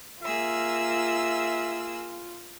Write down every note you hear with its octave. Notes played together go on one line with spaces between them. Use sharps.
A#3 F4 G#4 E5 E6